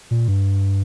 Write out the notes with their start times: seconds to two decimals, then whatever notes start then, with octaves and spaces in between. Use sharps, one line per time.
0.11 A#2
0.28 G2